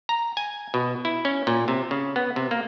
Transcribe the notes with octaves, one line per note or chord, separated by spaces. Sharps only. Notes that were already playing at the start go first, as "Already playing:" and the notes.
A#5
G#5
B2
E4
C#4
A#2
C3
C#3
B3
C3
A#3